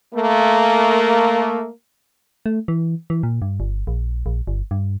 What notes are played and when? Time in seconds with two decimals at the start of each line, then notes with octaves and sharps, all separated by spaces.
0.14 A3 A#3
2.46 A3
2.68 E3
3.10 E3
3.23 A#2
3.42 G2
3.60 G1
3.87 A#1
4.26 A#1
4.47 G1
4.71 G2